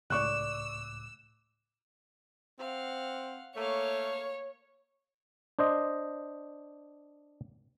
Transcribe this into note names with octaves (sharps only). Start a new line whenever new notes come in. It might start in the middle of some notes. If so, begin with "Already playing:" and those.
C#2 A2 D5 C#6 D6 E6 F#6
C4 F5 F#5
A3 A#3 C#5 F5
D4 C5 D#5